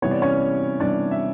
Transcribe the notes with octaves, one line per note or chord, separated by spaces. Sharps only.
C3 E3 G3 B3 C#5
D5
C#4 C#5
C3 E3 G3 B3 D4 D5
E5